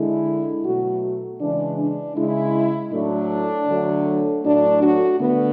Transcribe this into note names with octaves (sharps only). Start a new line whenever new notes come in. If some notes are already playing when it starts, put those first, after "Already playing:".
Already playing: D3 G#3 E4
B2 F#3 A3 F#4
C#3 E3 G#3 D4
D4
C#3 G#3 E4
A2 F#3 A3 D4
D3 F#3 A3
A2 F#3 A3 D4
F#4
D3 A3 B3